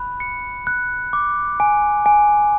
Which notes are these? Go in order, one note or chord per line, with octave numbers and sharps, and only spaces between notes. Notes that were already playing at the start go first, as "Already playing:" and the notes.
Already playing: B5 F#6
C#7
F#6
D6
G#5
G#5